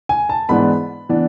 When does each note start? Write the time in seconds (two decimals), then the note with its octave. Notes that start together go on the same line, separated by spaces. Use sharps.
0.09 G#5
0.29 A5
0.49 G#2 E3 B3 D4 B5
1.09 E3 B3 D4